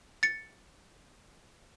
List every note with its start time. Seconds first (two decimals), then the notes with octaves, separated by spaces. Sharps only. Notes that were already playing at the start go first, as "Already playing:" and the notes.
0.23 A6 C#7